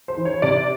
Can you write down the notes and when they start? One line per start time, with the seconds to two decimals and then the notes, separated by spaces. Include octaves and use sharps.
0.08 C5
0.17 E3
0.25 C#5
0.42 C3 D5